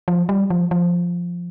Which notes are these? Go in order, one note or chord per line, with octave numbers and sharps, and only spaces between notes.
F3
G3
F3
F3